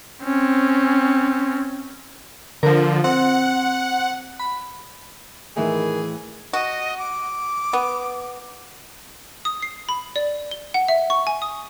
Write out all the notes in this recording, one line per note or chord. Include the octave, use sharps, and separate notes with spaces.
C4 C#4
D3 F3 A#4
C4 F#5
B5
A2 D#3 E3 G#4
F#4 D#5
D6
B3
D#6
C7
B5
D5
G7
F#5
E5
C#6
G#5
D#6